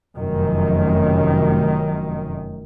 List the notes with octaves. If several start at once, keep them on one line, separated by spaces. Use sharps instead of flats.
F1 F#2 D#3